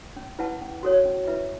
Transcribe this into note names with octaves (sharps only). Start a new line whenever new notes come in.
C#4
E4 B4 F#5 A5
C#4
F#4 A4 C#5
C#4
E4 B4 E5